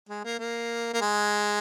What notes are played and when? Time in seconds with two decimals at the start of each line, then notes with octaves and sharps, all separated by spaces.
0.09 G#3
0.25 A#3
0.39 A#3
0.94 A#3
1.01 G#3